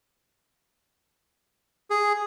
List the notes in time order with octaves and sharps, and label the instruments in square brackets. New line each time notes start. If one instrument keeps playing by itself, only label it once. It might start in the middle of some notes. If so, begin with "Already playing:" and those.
[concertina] G#4